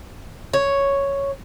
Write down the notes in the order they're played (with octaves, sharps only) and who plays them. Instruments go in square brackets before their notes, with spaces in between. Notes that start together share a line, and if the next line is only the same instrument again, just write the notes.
[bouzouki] C#5